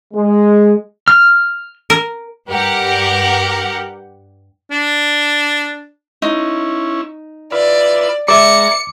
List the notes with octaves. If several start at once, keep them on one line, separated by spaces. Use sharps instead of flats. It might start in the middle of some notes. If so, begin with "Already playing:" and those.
G#3
F6
A#4
G2 G4 A#4 F#5
D4
C#4 D#4 E4
F4 B4 D5 E5
G#3 D5 E5 A#5 D6 C#7